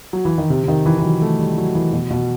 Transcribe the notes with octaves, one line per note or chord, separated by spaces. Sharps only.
F#3
E3
D#3
C3
C3
D#3
E3
E3
F#3
A3
G3
F#3
E3
B2
B2